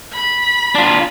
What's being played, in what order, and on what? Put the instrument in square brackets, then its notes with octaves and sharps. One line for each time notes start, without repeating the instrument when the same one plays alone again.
[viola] B5
[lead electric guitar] D4 F4